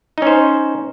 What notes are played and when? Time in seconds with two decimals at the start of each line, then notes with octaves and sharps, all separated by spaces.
0.18 D#4
0.22 C#4
0.27 C5